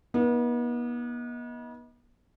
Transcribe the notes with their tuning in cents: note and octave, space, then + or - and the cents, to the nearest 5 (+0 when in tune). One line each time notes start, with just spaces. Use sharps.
B3 -40 D#4 +30